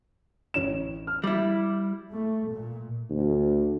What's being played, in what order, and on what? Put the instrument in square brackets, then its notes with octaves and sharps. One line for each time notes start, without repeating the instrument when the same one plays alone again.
[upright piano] A1 C#5 E7
F6
[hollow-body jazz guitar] G3 E4
[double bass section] A3
A#2
[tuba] D2